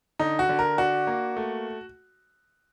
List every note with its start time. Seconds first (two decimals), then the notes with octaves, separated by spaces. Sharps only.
0.19 D3 D#4
0.39 F#4
0.49 D3
0.59 A#4
0.78 D4 F#4
1.07 A#3
1.37 A3